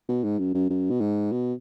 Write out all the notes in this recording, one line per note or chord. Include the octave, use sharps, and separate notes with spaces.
B2
G#2
F#2
F#2
F#2
B2
G#2
B2